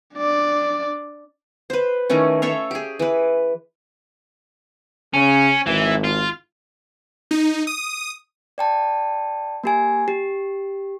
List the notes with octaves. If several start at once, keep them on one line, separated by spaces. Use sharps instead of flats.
D4 D5
B4 C5
D#3 E3 A3 C#4
A4 C#5 E5 F5
G4 G#4
E3 B4
C#3 C#4
G#1 E3
F4
D#4
D#6
D5 G5 A5
A#3 G4 G#5
G4